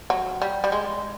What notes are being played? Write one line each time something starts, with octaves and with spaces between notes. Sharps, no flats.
F#3
G3
G3
G#3